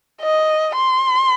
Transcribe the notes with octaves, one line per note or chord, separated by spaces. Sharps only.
D#5
C6